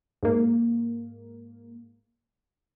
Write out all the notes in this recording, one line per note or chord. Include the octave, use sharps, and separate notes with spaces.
G#2 A#3